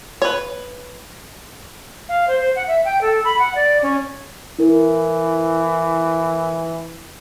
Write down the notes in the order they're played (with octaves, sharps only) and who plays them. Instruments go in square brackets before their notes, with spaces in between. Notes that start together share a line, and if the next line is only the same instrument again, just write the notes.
[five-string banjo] B4 C#5
[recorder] F5
C5
C5
F#5
E5
G5
A4
B5
F#5
D5
C#4
[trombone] E3 [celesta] E4 A#4